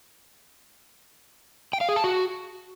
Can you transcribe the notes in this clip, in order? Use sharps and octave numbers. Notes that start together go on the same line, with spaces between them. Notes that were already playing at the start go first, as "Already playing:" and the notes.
G5
F5
G#4
A5
F#4